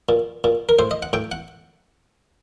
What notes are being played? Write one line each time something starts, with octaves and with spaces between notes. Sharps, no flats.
A#2
A#2
A#4
A2 C5
D#5
F#5
A2 G5
F#5